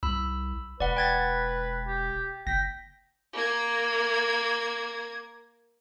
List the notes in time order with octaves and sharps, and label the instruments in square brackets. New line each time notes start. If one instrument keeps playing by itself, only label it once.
[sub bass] C2 [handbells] B5 E6
[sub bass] E1 [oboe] B4 [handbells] D5 F#5
[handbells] G5 G#6 A6
[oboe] G4
[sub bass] F#1 [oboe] G5 [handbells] A#6 B6
[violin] A#3 G#6